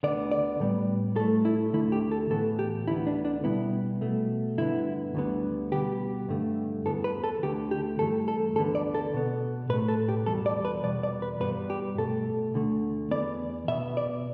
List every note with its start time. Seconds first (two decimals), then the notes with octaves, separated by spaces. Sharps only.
0.03 D2 D3 B3 D5
0.31 D5
0.60 A2 G3 B3
1.16 A2 A4
1.20 A3
1.45 E4
1.73 D2 D3 A3 E4
1.92 G4
2.11 A4
2.30 A2 E3 B3 A4
2.59 G4
2.87 D2 D3 B3 E4
3.07 D4
3.25 D4
3.44 B2 G3 B3 E4
4.01 B2 A3
4.58 G2 D3 B3 E4
5.15 D2 D3 G3 B3
5.72 B2 G3 B3 G4
6.29 G2 D3 A3
6.86 E2 E3 B3 A4
7.04 B4
7.24 A4
7.43 D2 D3 A3 G4
7.71 G4
7.99 G2 E3 A3 A4
8.28 A4
8.56 D2 D3 B3 A4
8.75 D5
8.95 A4
9.14 B2 B3
9.69 A2 B4
9.74 A3
9.88 A4
10.08 G4
10.26 E2 B2 G3 A4
10.46 D5
10.65 B4
10.83 E2 B2 G3 D5
11.03 D5
11.22 B4
11.40 G2 G3 B3 B4
11.70 G4
11.98 B2 A3 A4
12.54 D2 D3 A3
13.11 E2 E3 B3 D5
13.68 B2 B3 E5
13.97 D5